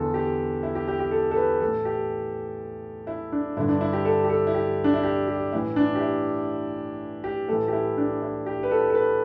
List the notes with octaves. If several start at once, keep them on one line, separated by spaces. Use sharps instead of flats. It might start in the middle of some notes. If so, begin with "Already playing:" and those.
Already playing: E2 D3 A4
G4
E4
G4
G4
G4
A4
A4
B4
A2 E3 A4
G4
E4
D4
G2 D3 E4
D4
E4
G4
A4
G4
A4
E4
G4
D4
E4
G4
G4
A2 E3 E4
D4
G4
E4
G4
A2 E3 A4
G4
E4
D4
E4
G4
B4
A4
A4
B4